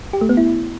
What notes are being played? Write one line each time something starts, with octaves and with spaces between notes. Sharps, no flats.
G4
A3
B3
E4